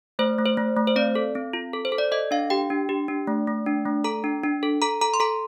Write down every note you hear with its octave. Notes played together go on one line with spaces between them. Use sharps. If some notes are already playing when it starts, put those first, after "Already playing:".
A3 C5
A3
C5
A3
A3
C5
C4 D5
A4
C4
F4
A4
C5
A4
D5
A4 D#5
D4 F5
G4 G5
D4
G4
D4
A3
A3
D4
A3
A4 A#5
D4
D4
A4
A4 A#5
A4 A#5
C6
A4 A#5